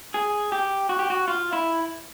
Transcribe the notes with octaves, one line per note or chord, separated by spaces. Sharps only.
G#4
G4
F#4
G4
F#4
F4
E4